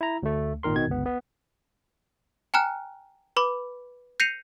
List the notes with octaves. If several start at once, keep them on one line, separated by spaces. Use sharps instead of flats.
E4 A#5
D2 A3
G#1 A#2 D#3 A#4 C6
B2 D#3 G#6
G1 C#2 B3
B3
G5 G#5 A#5 F6 F#6
B4 B5 D6
G6 A#6 C7 C#7 D#7 F7